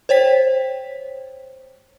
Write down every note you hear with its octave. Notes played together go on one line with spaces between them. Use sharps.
C5 C#5 G5 B6